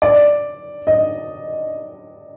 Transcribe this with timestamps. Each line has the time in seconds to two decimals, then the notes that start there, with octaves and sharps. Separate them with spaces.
0.02 D5
0.87 D#5